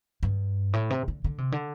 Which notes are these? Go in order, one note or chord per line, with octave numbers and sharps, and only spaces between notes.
G2
A2
C3
D3
D3
C3
D3